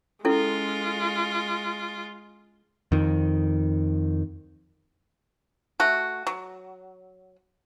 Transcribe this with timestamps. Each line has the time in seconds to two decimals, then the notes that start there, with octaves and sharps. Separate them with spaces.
0.25 G#3 C#4 E4 F4 A4
2.92 F2 D#3
5.80 A3 F#4
6.27 F#3